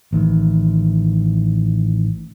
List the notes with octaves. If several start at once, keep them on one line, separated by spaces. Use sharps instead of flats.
A1 D#3